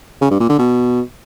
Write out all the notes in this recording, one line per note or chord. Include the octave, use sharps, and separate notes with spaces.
C#3
G2
A#2
D3
B2